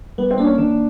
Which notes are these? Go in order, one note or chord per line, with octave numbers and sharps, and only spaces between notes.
G3 B3
C4
A#3 D4
C#4
D#3 D4